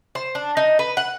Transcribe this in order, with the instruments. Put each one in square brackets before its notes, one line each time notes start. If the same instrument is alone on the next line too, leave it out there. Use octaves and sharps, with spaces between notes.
[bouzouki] C5
D4
D#4
B4
F#5